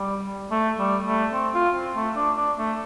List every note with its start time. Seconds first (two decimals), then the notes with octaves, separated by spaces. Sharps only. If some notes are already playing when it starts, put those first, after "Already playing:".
Already playing: G3
0.51 A3
0.79 G3
1.06 A3
1.33 C4
1.54 F4
1.74 C4
1.96 A3
2.16 D4
2.37 D4
2.58 A3